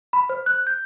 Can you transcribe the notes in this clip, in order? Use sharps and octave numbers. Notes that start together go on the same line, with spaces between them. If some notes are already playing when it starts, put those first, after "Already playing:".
B5
C5
F#6
G6